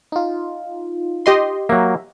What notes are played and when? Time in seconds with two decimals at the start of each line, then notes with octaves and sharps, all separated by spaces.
0.12 D#4 F4
1.26 G4 D#5 C6
1.69 F#3 A#3 E5